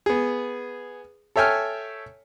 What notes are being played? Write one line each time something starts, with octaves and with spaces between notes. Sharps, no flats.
B3 G#4
A4 C#5 E5 G5 G#5 F6